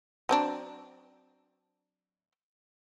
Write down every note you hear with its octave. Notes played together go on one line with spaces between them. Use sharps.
F#3 C4 D4